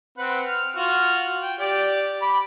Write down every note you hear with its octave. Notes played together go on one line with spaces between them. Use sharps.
C4 B4 F#5
F6
F4 F#4 F6
G5
G4 D5
B5 D6